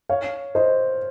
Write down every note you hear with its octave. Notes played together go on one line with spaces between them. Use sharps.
C#5 F5
C5 D#5